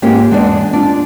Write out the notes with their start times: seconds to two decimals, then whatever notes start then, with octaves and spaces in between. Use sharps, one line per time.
0.02 G#2 G#3 A#3 C#4 F4 G4
0.31 E2 G#3 D4 C5 D5
0.73 D4 F4